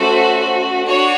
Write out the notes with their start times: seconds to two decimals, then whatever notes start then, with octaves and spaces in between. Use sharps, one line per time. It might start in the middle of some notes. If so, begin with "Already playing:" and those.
Already playing: A3 C#4 F#4 A4 C5
0.87 D4 F#4 C#5